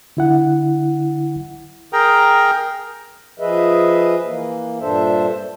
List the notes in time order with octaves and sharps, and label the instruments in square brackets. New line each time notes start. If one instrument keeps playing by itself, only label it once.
[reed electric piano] D3 E4 F#5
[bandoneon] G#4 A#4 G5 A#5
[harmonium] F3 G#4 B4 D#5 E5
E3 A#3
G2 A#2 D4 A4 C5 E5